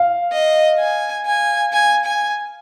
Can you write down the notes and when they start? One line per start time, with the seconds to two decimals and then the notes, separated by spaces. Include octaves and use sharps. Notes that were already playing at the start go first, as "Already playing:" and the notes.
Already playing: F5
0.32 D#5
0.80 G#5
1.27 G#5
1.73 G#5
2.05 G#5